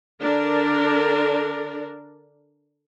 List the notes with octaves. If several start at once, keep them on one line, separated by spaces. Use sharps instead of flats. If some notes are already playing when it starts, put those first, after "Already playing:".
D3 D4 A#4 D5